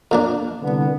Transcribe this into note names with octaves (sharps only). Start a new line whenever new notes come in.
F2 A#3 D4
C2 D3 B3